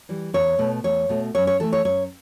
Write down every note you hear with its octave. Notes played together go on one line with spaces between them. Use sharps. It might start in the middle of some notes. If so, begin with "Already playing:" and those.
E3 G3
E2 C#5
B2 A3
E2 C#5
B2 A3
F#2 C#5
C#5
E3 A3 A4
C#5
F#2 C#5